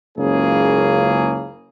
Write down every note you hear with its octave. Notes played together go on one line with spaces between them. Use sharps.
F#1 C#2 C#3 A#3 G#4